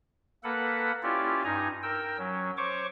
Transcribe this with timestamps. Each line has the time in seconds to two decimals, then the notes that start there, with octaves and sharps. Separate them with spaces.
0.44 A#3 A4 B4 F#5 B5
1.03 C#4 E4 F4 G4 D5
1.44 G2 D#4 G#5 A#5
1.83 A#4 G5 E6
2.19 F#3 C#4
2.57 C5 C#5 C#6 D6